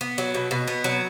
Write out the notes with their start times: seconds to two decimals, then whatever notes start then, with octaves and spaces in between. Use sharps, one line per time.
0.01 B3
0.18 F#3
0.34 B2
0.51 B2
0.68 B3
0.84 F#3